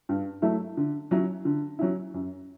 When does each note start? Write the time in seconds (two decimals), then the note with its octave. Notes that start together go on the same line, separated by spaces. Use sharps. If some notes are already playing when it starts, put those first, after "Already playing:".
0.09 G2
0.42 F#3 A3 E4
0.77 D3
1.11 F#3 C#4 E4
1.45 D3
1.79 F#3 C#4 E4
2.14 F#2